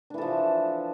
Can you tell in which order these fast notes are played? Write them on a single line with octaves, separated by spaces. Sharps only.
D4 E3 A4 F3